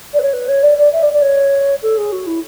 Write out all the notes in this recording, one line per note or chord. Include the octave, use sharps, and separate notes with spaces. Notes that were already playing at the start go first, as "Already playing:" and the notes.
D5
B4
C#5
B4
C#5
D5
D5
E5
D5
D5
C#5
A4
G#4
F#4
E4